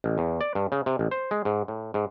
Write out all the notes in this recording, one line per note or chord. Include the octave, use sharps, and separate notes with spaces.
A1
E2
D5
G2
C#3
C3
A1
C5
G#3
G#2
A2
G#2